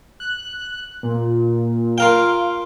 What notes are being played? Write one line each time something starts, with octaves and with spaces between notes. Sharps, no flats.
F#6
A#2
F4 A#4 F5 G5